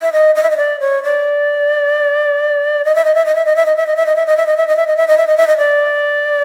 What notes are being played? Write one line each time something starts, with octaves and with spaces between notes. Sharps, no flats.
E5
D#5
D#5
E5
D#5
D5
C#5
D5
D#5
E5
D#5
E5
D#5
E5
D#5
E5
D#5
E5
D#5
E5
D#5
E5
D#5
E5
D#5
E5
D#5
E5
D#5
E5
D#5
E5
D#5
E5
D#5
D5